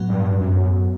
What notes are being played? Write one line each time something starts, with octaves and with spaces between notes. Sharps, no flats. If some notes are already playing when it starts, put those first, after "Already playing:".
Already playing: A2 F#3 B3 F#4
G2
F#2